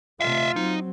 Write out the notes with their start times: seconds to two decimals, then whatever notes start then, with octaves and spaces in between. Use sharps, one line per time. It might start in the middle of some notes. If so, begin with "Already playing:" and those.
0.21 C3 A3 F4 E5 F5
0.56 F#3 C4 D#4